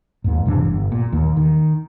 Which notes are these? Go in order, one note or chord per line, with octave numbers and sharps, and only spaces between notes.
D#2 G#2
G2 C3 E3 D4
G1
A#2
D#2
D#3